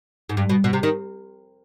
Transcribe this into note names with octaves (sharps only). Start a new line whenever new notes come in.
G#2
G2
B2
B2
C3
D#3